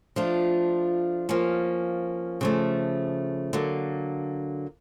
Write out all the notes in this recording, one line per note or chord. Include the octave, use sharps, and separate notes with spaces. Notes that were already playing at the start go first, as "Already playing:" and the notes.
F3 A3 D4 F4
F3 A#3 C#4
C#3 F3 A3
D3 F#3 A#3